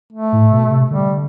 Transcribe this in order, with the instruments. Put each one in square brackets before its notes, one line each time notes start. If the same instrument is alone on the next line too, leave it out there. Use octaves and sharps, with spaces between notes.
[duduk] A3
[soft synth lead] A2
B2
C3
[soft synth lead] D3 [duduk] G3